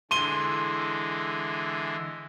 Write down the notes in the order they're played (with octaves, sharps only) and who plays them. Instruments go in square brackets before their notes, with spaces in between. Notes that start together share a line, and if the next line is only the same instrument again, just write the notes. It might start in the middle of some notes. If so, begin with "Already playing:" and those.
[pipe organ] D3 E3 G#3 [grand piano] C6 D#7 G7